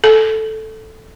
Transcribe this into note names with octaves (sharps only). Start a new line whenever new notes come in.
A4